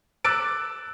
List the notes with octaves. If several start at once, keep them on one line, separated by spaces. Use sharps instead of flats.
D6 E6 F#6 A6 D7